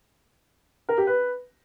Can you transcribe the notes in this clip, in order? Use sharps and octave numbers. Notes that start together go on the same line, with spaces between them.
A#4
G4
B4